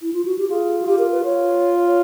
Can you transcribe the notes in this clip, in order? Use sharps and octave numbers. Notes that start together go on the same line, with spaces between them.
E4
F4
F#4
G4
F4 G#4
F#4
F4 G4
A#4
B4
F4 C#5
C#5